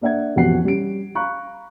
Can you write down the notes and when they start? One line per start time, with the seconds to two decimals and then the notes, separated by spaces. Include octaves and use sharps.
0.01 A#3 D4 E5 F#5 G#6
0.36 A1 F2 B2 G4 F#5 C7
0.65 G3 C#4 D7
1.15 F5 A#5 B5 C#6 F#6